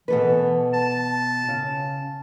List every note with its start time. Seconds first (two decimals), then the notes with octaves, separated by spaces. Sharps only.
0.08 B2 E3 A4 B4
0.74 A5
1.49 C#3